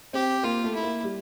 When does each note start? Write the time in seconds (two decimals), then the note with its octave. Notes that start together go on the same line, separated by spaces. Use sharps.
0.13 C4 G4
0.43 A#3 F4
0.64 A3
0.74 E4
0.83 A#3
1.03 G3